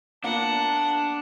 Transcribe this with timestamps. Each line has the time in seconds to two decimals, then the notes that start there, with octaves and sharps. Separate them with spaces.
0.24 A#3 B3 D4 F4 F#5 A5